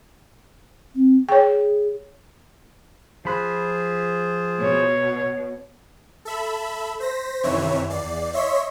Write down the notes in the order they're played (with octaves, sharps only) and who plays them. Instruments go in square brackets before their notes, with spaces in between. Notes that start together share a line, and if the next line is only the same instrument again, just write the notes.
[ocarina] C4
[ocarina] G#4 [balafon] C#5 G5
[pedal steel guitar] F3 B5 F#6 [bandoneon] F4 G#4 C5
[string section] B2 [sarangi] C#5
[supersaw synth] A4 E5 B5
C5 A#6 B6
F#2 C3 D#3 E3 C#5 E5
E2 D5 C7
C#5 D#5 E5 C6 C#6 B6